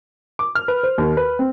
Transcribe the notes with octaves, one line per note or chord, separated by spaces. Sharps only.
D6
F6
B4
C5
D#2
B4
C4